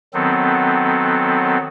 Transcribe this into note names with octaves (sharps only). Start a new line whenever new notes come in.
D#3 F#3 B3 C4 A4